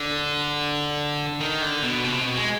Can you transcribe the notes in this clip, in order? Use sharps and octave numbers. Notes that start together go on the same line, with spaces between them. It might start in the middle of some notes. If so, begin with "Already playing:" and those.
Already playing: D3
D#3
D3
B2
C3
B2
G#3